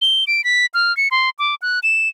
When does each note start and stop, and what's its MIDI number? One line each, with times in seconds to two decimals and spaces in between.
0.02 0.24 103
0.27 0.44 98
0.44 0.66 95
0.74 0.95 89
0.97 1.08 97
1.11 1.30 84
1.39 1.55 86
1.62 1.79 90
1.83 2.09 100